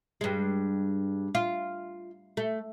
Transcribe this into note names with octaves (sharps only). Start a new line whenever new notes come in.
G2 G#3
F4
A3